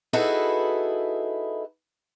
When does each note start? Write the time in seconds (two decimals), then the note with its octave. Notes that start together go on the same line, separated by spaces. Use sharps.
0.13 D#4 E4 F#4 G#4 A4 B4